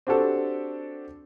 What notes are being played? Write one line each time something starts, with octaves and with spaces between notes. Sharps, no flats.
C4 D4 F#4 G4 A4